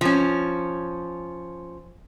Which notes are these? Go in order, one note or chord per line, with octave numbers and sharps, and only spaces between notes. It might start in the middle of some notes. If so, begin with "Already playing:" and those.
F3 C#4